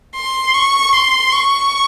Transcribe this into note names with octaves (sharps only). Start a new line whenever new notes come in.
C6
C#6
C6
C#6